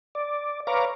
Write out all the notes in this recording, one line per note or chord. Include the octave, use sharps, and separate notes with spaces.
D5
B4 C#5 F5 A#5 D6